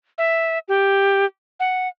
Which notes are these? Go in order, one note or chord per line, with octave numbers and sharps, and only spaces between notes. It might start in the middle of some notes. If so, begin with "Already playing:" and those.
E5
G4
F#5